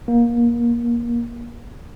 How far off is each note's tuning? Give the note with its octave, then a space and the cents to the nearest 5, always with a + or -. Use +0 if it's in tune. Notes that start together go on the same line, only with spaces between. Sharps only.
A#3 +20